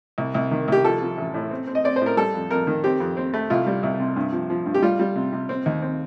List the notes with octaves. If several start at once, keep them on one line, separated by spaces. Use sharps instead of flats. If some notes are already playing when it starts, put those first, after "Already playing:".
C2
C2
D#3
C2 G4
F3 A4
F3
A1
A2
C4
C4
D#5
C4 D5
A2 C5
A#4
G3 A4
F2
F2 A#4
D#3
C4 G4
F2
C4
A3
C2 F4
G3
C2
C3
G2
F3
F3
G2
G4
G3 F4
G3
C3
C3
C4
D#2
C4